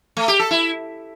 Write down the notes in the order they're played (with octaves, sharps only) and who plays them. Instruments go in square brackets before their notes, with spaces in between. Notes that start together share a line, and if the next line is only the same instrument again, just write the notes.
[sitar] A3
G4
A4
E4